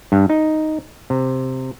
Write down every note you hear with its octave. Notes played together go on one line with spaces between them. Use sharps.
G2
D#4
C3